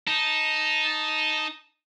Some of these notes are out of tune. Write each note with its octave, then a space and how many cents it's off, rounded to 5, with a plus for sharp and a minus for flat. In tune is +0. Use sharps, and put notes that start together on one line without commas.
D#4 +0 A5 +0